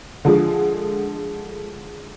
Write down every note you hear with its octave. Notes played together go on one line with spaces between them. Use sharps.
D3 F3 G#3